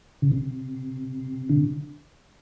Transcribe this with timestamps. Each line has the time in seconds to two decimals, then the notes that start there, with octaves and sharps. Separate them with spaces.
0.22 C#3
0.32 C3
1.49 D3